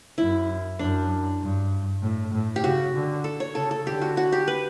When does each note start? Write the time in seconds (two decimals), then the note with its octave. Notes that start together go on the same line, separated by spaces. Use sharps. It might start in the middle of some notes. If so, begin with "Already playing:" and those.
0.18 F#2 E4
0.79 F#2 D4
1.40 G2
2.02 A2
2.33 A2
2.56 G4
2.64 C#3 F#4
2.94 D3
3.24 A4
3.40 C#5
3.55 C#3 A4
3.71 A4
3.86 D3 G4
4.02 F#4
4.17 F#4
4.32 G4
4.48 B4